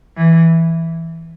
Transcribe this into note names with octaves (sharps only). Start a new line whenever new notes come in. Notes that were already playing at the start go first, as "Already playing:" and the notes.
E3